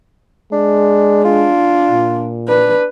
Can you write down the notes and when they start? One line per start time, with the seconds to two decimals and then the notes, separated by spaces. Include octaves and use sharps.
0.52 G#3 D4
1.25 D4 F4
1.91 A#2
2.49 D4 B4